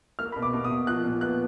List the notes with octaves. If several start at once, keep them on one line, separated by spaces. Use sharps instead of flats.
A#3 F6
B2 B5
D6
B2
D#6
B2
F3 F#6
A#2
B3 F#6